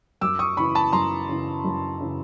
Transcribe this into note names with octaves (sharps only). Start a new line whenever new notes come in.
F#2 D6 E6
C#6 D#6
C#3 E3 B5 C#6
A5 B5
F#2 A#5 C6
C#3 E3
F#2
C#3 E3